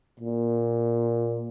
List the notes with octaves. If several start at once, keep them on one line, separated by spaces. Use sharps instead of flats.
A#2